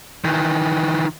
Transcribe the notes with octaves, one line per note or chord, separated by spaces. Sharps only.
D#3 E3